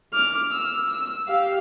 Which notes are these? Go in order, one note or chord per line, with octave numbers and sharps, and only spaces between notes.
D6 F6
E6
E6
G4 F5